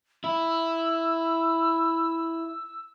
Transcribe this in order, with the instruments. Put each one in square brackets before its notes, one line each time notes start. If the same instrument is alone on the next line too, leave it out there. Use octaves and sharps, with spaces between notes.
[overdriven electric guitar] E4 [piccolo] E6